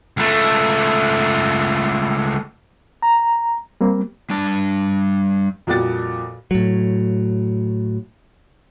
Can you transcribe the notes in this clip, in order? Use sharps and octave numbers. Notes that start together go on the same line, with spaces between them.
C#2 A3
A#5
G3 A#3 C4
G3 D4 A5
F2 A#2 G3 F#4 G4 A6
A2 F#3